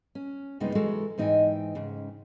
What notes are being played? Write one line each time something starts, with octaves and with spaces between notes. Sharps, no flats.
C#4
F#2 C3 G3 G#3 B3 D#4
E3 G#3 F#4 A4 A#4
G#2 E3 D#4 D#5 G5 G#5
G#2 C#3